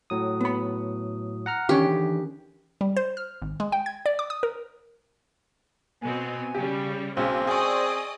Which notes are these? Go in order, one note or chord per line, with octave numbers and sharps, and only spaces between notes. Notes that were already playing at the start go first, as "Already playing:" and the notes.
A2 F#3 D#6
B3 B5
F#5 A#5 F6
E2 D3 D#3 C#4 G4
G3
C5
F6
G#1
G#3
G5
G#6
D5
D6
D#6
A#4
B2 B3 C4 G#5
C#3 G3 G4
B1 G#3 C4 C#4
G#4 D5 D#5 G#5 C#6 D#6